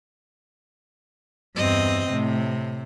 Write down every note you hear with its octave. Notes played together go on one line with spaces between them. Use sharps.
E2 G2 C4 D#5
A2 C3